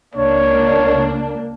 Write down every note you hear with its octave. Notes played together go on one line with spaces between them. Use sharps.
C#2 A#3 D4 C#5